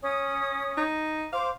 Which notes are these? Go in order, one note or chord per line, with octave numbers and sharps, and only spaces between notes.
C#4 D#6
D#4
C5 F5 D6